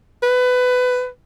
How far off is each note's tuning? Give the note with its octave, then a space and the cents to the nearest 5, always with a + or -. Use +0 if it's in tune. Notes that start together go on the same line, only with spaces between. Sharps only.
B4 +20